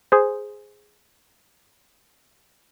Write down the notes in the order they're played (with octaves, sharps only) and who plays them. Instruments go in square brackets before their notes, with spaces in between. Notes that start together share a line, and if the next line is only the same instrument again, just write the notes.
[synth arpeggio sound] G#4 C5